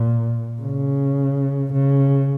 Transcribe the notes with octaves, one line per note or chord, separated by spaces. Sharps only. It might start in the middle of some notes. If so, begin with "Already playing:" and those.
Already playing: A#2
C#3
C#3